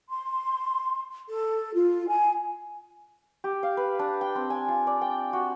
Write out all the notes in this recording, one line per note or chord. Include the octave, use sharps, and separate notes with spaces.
C6
A4
F4
G#5
G4
F5
B4
D4
G5
C4
G#5
F4
D5
G5
F#4